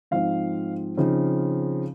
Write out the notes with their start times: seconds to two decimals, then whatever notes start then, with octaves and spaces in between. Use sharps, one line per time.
0.11 G#2 F3 C4 D#4 F5
0.97 C#3 F3 C4 D#4